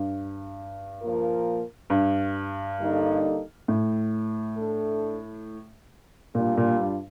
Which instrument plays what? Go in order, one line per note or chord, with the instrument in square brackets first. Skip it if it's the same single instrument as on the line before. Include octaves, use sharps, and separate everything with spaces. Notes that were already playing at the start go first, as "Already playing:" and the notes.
Already playing: [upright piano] G2
[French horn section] A#2 F3 A#3 F4 A#4
[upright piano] G2
[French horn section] D3 G3 A#3 D#4 A4
[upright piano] A2
[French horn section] A3 D4 A4
[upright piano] A#2 [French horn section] G3 D4 F4
[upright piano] A#2
G2